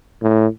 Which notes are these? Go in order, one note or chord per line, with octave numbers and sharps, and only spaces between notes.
A2